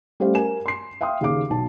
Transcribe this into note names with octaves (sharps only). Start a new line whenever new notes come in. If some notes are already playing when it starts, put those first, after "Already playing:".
G3 A3 C#4 G4 C5 F5
A#4 G#5 E7
C6 C7
E5 F5 G5 C6 D#6
D#2 C#3 G#4 F5 D6
B1 A5